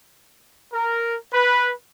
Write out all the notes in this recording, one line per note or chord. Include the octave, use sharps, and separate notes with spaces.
A#4
B4